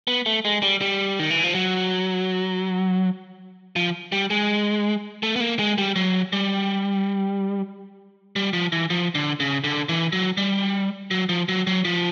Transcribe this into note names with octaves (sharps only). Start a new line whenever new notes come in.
B3
A3
G#3
G3
G3
D#3
E3
F3
F#3
F3
G3
G#3
A3
B3
A#3
G#3
G3
F#3
G3
G3
F3
E3
F3
D3
C#3
D3
E3
F#3
G3
F#3
F3
F#3
F#3
F3